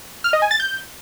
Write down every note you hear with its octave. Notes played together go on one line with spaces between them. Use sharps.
F6
D#5
G#5
A6
G6